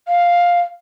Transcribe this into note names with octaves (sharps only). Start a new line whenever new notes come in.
F5